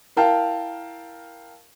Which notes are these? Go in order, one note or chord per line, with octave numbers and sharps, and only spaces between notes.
E4 A#4 F5 G5 A5